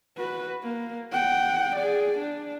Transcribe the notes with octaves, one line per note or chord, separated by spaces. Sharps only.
F#4 B4
A#3
F#5 G5
G#4 D5
D4